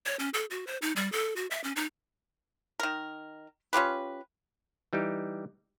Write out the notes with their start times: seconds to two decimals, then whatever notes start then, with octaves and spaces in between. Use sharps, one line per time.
0.06 C#5
0.19 C#4
0.34 A4
0.50 F#4
0.67 C5
0.82 D#4
0.96 G3
1.12 A4
1.36 F#4
1.50 E5
1.64 C#4
1.76 D#4
2.80 D#3 A#4
3.73 C#4 F4 G4 B4
4.93 E3 G3 D#4 G4